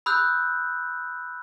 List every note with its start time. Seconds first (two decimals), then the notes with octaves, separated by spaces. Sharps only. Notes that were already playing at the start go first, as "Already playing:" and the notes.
0.06 B5 D#6 E6 F#6 G6